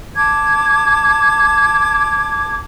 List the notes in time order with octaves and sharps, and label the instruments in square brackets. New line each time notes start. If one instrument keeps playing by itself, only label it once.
[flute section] A5 D6 G#6